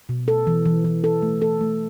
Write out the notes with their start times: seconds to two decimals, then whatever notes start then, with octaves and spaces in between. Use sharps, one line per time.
0.09 B2
0.28 A4
0.47 E3
0.65 E3
0.85 E3
1.04 A4
1.22 A3
1.42 A4
1.61 A3